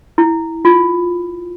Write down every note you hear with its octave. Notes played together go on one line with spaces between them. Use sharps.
E4
F4